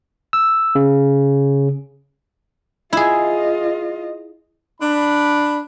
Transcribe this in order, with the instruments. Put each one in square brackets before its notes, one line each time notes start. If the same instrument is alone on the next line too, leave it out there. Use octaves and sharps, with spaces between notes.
[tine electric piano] E6
C#3
[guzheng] E4 G#4 [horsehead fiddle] F4 D#5
[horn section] D4 B5